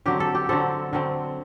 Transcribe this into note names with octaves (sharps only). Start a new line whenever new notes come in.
D3 F#3 C4 G4
A4
G4
D3 F#3 C4 A4
D3 F#3 C4